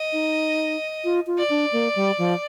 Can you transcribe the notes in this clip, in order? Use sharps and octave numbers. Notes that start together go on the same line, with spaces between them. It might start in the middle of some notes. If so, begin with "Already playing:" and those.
Already playing: D#5
D#4
F4
F4
D5
D4
A#3
G3
F3